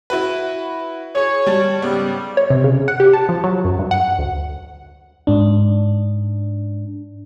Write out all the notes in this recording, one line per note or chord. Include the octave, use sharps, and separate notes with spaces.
E4 F#4 B4
G#4 C#5
G3 A5
G#2 C#3 G3 B3
C#5
C3
C#3
F#5
G4
A5
F3
F#3
F#2
G2
F#5
D2
G#2 D4